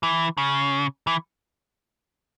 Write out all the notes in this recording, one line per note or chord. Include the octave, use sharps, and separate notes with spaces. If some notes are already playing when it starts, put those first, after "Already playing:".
E3
C#3
E3